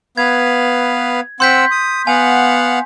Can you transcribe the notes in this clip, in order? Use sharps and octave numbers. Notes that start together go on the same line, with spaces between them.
B3 B4 F5 G#6
C4 F#5 C6 E6 G6 B6
D#6
B3 F5 F#5 G#5